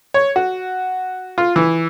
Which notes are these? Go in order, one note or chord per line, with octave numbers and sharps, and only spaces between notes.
C#5
F#4
F4
E3